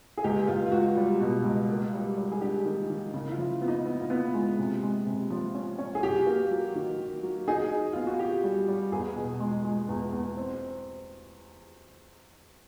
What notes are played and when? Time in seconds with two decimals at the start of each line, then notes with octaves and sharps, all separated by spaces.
0.17 G#4
0.24 C#2 G4
0.48 C#2 F4
0.66 F4
0.72 C#2 F#4
0.97 G3
1.20 B2
1.44 C#2
1.69 A#3
1.93 G3
2.17 G3
2.32 G#4
2.41 D4 G4
2.65 D#3
2.90 D#3
3.14 C#3
3.28 E4
3.31 F4
3.38 F3
3.61 B3
3.68 D#4
3.86 B3 E4
4.00 F4
4.10 B3 E4
4.34 G#3
4.59 C3
4.83 G#3
5.07 C3
5.31 F3
5.55 C#4
5.79 C#4
5.95 G#4
6.03 F#3 G4
6.27 A#3
6.51 F#3
6.75 D#3
6.99 D#3
7.23 F#3
7.48 D#4 G#4
7.71 D#4
7.93 B3 F4
8.07 F#4
8.19 G4 G#4
8.44 G3
8.68 G3
8.92 E2 G#4
9.16 B2
9.40 G#3
9.65 G#3
9.89 E2
10.13 E2
10.37 C4